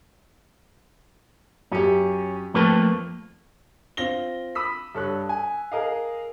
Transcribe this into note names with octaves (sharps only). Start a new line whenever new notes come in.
F#2 C#4 G4
F2 F3 A3 A#3 B4 A5
C4 F4 A#6 G7
B5 D#6 E6 B6
G2 A4 C#5 F#6
G#5
G#4 A#4 D#5 F5